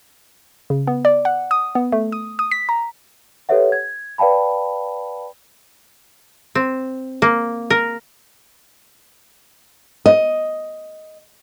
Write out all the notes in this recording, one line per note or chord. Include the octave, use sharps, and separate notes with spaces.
C#3
B3
D5
F#5
D#6
B3
A3
D#6
D#6
B6
A#5
G4 A4 B4 C#5 E5 F#5
G#6
B4 D5 F5 G5 A5 B5
C4
A#3
A#4
D#5